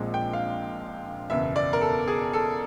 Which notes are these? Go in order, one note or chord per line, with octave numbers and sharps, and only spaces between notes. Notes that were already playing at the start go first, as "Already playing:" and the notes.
Already playing: A#1 A#2 F3 G#3 C4
G5
F5
F#1 E2 B2 E5
D5
A#4
A4
G#4
A4